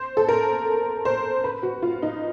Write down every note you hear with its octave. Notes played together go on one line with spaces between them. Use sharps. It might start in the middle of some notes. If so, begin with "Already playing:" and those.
Already playing: C5
A4
A#4
C5
B4
F#4
F4
D#4